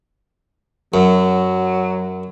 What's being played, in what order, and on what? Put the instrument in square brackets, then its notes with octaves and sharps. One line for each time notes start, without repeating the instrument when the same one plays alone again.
[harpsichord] F#2 [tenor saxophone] F#3